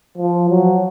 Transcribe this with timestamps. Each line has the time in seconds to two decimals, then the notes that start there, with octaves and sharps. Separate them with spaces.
0.18 F3
0.50 F#3